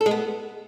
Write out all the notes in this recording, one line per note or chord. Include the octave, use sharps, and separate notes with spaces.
A4
G#3
B3